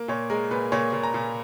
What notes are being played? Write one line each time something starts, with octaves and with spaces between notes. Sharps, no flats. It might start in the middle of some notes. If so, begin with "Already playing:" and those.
Already playing: A#3
A#2 C#5
G#3 A#4
A#2 B4
A#2 C#5
A#2
A#5
A#2